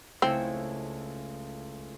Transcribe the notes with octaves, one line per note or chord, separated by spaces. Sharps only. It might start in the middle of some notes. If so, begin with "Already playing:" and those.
C#2 A3 C4 E4